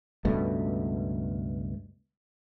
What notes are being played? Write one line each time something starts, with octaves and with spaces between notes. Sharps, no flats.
C#2 G2 B2 A3